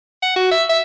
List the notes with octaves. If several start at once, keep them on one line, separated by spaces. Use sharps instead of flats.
F#5
F#4
E5
E5